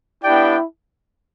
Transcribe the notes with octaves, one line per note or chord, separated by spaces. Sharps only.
B3 D4 E4 G4 D5 G5